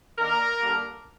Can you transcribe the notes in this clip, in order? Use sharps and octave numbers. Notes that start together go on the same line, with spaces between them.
D#3 A#3 D4 A#4
D3 G3 A#3 D4